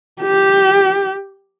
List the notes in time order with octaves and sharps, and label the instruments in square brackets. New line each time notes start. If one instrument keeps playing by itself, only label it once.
[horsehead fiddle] G4